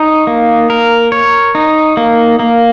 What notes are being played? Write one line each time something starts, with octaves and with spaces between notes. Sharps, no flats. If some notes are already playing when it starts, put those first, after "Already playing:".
Already playing: D#4 C#5
A#3
A#4
C#5
D#4
A#3
A#3